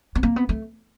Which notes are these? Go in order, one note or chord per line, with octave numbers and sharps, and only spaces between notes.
B3
A#3
B3
A3